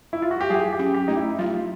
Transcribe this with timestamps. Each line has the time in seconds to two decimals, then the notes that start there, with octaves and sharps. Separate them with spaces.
0.13 E4
0.22 F4
0.31 F#4
0.41 G4
0.50 F#3 G#4
0.73 G4
0.79 C#4
0.94 G4
1.08 A3 D#4
1.17 E4
1.39 F#3 F4